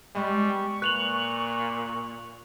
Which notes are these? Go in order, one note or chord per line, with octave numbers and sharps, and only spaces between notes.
G3 G#3 B3 D#5 C#6
A#2 F4 B4 F#6 F7 F#7